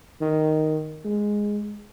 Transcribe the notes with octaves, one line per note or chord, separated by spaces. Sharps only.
D#3
G#3